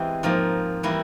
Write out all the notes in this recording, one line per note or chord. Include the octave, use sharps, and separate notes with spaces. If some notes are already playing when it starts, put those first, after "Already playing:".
Already playing: E2 E3 G#3 C4 G4
G#2 F3 A#3
E3 G3 A#3 E4